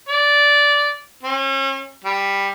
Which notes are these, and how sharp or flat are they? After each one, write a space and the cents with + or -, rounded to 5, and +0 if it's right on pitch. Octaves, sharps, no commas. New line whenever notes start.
D5 -15
C#4 -40
G3 +10